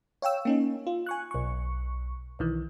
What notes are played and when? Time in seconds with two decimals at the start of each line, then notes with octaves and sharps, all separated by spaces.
0.22 C#5 F5 G5 E6
0.45 A#3 C#4 D#4
0.87 F4
1.06 G#5 C#6 F#6
1.31 B1 C#6
2.39 B1 D#3 E3